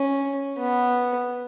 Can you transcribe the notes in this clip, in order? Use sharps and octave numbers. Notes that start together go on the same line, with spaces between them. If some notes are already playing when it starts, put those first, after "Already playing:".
Already playing: C#4
B3